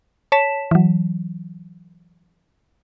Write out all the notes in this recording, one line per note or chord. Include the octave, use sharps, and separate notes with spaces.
C#5 A5 B6 E7
E3 F#3